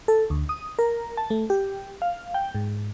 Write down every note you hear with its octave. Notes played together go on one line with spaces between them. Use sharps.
A4
D2
D#6
A#4
A5
A3
G4
F5
G5
G#2